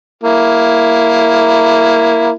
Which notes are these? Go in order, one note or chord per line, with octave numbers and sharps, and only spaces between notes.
A#3 E4